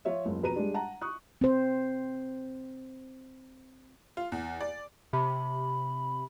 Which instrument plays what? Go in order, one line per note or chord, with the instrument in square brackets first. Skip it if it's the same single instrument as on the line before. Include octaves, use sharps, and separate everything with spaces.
[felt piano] F3 F4 C#5 E5
F#1 C#2
F2 B2 B4 A#5 D#7
G3 G#3 D4
F#5 A5 A#5
C#6 D#6 F#6
[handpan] C4 C5
[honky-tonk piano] F4
E2
D5
[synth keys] C3 [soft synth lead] B5